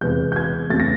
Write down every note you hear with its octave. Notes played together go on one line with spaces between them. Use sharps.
E2 C3 E3 G#3 G6
G6
G#6
E2 C#3 F#3 A3 A6
A#6